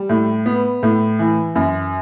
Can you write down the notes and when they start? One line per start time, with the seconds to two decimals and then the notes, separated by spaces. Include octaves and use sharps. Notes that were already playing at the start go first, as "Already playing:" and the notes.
Already playing: G3
0.09 A2
0.46 B3
0.83 A2
1.19 E3
1.55 F#2